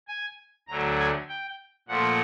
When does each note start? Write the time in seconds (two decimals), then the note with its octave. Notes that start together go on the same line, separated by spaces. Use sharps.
0.08 G#5
0.68 D2 D3 F#3 A3 A#5
0.98 G#5
1.29 G5
1.88 A#2 F3 A3 F#5